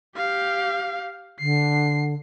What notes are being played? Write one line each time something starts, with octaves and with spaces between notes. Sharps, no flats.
G4 F5
D3 C7